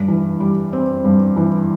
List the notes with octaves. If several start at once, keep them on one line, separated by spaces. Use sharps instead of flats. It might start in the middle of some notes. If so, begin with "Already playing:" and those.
Already playing: G2
E3
G3
C4
G2
E3